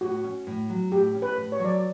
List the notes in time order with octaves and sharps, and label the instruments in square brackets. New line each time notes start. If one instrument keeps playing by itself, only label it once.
[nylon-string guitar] A2 [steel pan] F#4
[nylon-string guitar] C#4
A2
F#3
[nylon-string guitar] A2 [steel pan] G4
[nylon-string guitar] C#4
[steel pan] B4
[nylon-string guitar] A2
[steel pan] C#5
[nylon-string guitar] F#3
[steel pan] D5